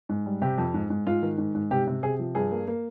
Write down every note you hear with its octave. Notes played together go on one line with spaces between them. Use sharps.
G#2
G3
C3 G4
F2
G#2
G#2
G#2 F4
D#3
G#2
G#2
C3 G4
C3
C3 G#4
F3
G2 G#4
A#3
A#3